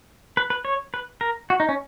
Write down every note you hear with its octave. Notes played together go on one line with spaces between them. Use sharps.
B4
B4
C#5
B4
A#4
F#4
D#4
C#4